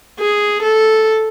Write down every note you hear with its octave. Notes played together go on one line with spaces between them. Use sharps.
G#4
A4